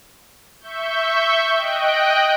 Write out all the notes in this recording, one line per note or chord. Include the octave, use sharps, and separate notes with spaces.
E5 C#6 G6
D#5 G5 F#6 D7